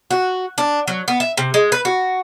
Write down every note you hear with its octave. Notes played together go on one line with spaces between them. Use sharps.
F#4
D4
F#3
B3
E5
C3
G#3
B4
F#4